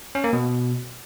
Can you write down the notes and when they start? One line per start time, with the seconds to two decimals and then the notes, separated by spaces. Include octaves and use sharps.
0.15 C#4
0.24 A#3
0.33 B2